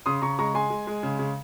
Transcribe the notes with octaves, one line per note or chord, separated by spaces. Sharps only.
C#3 C6 D#6
C#3 A#5 C#6
G#3 A#5 C#6
G#3 G#5 C6
G#3
G#3
C#3
C#3